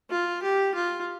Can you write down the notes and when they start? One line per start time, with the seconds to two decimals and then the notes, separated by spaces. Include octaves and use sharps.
0.10 F4
0.42 G4
0.75 F4